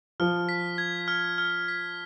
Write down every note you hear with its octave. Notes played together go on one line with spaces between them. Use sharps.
F3 F6
B6
G#6
F6
F6
B6